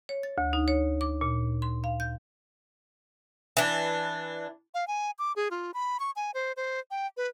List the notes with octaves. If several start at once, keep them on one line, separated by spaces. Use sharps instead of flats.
C#5
A6
D2
D#4
C#5
D6
A#2
C6
F5
G6
E3 D4
F5
G#5
D6
G#4
F4
B5
C#6
G#5
C5
C5
G5
B4